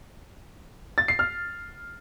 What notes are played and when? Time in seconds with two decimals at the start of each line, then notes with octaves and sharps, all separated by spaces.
0.98 A6
1.08 C7
1.19 F6